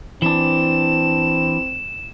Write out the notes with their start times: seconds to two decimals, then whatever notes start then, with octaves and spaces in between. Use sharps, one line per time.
0.22 E3 C4 D4 E7